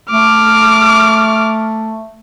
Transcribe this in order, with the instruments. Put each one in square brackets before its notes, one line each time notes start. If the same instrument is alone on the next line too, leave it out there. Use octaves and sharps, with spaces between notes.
[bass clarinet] A3 [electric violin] D6 F6